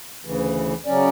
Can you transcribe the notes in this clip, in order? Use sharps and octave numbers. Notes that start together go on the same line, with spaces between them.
D2 C#3 E3
C#3 F#3 C#4 D5